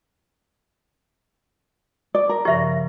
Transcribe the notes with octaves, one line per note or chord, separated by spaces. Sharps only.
D5
A#4
G2 C#3 F3 G4 E5